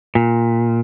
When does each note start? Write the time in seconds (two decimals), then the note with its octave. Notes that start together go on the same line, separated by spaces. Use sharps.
0.15 A#2